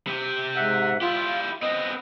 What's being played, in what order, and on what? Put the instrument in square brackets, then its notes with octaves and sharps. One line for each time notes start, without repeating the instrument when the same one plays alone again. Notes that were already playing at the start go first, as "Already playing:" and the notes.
[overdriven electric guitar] C3 G4
[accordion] G#2 E5 F#5
[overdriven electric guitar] E4 G4 [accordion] F4
[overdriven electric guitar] B3 C4 [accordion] D#5